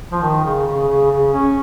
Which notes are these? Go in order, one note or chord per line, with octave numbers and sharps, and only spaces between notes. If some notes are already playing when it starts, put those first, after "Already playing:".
F3
D#3
C#3
C#3
C#3
C#3
C#4